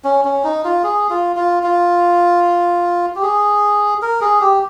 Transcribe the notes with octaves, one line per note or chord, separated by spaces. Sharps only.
C#4
C#4
D#4
F4
G#4
F4
F4
F4
G4
G#4
A#4
G#4
G4